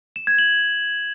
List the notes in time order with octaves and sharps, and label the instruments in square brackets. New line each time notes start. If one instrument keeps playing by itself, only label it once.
[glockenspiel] E7
G#6
F#7